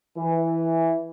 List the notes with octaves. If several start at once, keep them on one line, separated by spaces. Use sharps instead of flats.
E3